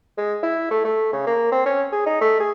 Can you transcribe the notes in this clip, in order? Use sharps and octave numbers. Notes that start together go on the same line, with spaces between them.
G#3
E4
A3
A3
C#3
A#3
C4
C#4
G#4
D#4
A3
G#4